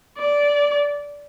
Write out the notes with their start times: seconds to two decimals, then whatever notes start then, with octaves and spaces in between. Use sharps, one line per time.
0.18 D5